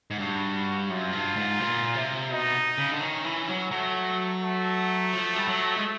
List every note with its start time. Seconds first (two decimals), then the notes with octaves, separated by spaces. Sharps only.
0.11 G#2
0.19 G2 F#4
0.89 F#2 F4
1.12 G2
1.36 G#2
1.60 A#2
1.95 C3
2.30 B2 D#4
2.78 C#3
2.92 D3
3.00 D#3 C#4
3.24 E3
3.48 F#3
3.71 F#3 A3
4.42 A3
5.13 F3
5.36 G3
5.48 F#3
5.76 G#3